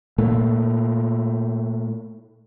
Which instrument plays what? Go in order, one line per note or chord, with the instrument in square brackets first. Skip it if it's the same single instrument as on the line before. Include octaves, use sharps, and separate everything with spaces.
[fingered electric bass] A#2 A3